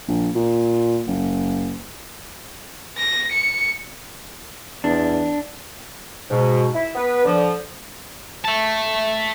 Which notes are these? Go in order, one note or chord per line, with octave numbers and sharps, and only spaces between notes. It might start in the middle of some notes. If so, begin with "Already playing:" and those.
A#1
A#2
F#1
A#6
C#7
E2 D4
G#2 B2
E4
B3 B4
D3 F3
E5 A5